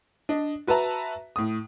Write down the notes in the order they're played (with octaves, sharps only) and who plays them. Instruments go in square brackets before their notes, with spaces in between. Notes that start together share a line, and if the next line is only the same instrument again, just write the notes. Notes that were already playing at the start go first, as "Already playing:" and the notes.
[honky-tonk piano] D4 D#5
F#4 B4 E5 A5 A#5
A2 D#6